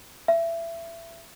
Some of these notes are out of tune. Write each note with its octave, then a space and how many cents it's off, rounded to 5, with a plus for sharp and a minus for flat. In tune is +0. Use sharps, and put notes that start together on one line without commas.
E5 +20